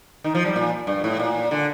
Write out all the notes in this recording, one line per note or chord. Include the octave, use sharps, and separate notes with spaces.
D#3
F3
G3
A#2
G2
A2
A#2
D3